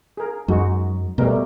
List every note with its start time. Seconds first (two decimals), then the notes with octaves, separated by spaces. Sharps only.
0.17 G#4 A#4
0.48 F#2 G#3 D#4 F#4
1.18 B2 G3 A3 A#4